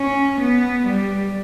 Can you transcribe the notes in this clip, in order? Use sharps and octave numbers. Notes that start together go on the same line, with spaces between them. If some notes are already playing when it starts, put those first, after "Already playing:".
Already playing: C#4
B3
G3